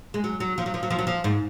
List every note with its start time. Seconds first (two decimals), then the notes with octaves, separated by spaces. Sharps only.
0.14 G#3
0.24 F#3
0.40 F#3
0.58 F3
0.66 F#3
0.74 F3
0.83 F#3
0.90 F3
0.99 F#3
1.07 F3
1.24 G#2